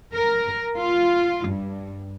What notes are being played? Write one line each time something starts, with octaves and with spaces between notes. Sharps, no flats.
A#4
F4
G2